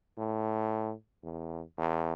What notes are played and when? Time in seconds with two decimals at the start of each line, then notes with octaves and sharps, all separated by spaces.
0.18 A2
1.24 E2
1.78 E2